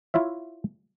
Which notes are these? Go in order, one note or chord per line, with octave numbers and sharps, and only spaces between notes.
E4 F4 C#5 E5